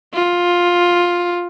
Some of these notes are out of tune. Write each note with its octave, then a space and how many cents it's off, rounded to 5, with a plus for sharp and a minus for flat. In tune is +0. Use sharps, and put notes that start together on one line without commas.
F4 +10